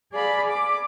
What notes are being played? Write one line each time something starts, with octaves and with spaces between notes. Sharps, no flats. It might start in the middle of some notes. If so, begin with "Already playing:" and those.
G#4 D5 F5 B5
D6